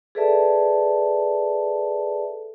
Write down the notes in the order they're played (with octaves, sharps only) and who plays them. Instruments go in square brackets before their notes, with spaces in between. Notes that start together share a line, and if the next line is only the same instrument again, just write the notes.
[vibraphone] G#4 A4 B4 D5 E5 A5